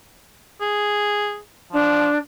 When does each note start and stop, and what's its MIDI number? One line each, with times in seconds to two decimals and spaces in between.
0.61 1.39 68
1.73 2.08 53
1.73 2.18 62